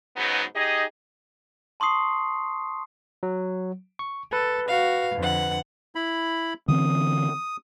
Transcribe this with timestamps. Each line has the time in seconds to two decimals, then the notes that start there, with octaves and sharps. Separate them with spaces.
0.17 G#2 C#3 F#3 B3 D#4 B4
0.56 D#4 G4 G#4 D#5
1.80 A5 C6 C#6 D#6 C7
3.23 F#3
3.99 C#6
4.33 A4 B4
4.68 F#4 F5
5.16 F2 D3 F#5
5.95 E4 B5
6.68 D3 E3 C4 D#6